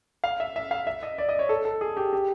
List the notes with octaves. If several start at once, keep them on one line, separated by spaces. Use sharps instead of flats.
F5
E5
E5
F5
E5
D#5
D5
D#5
C#5
A4
A4
G#4
G4
G4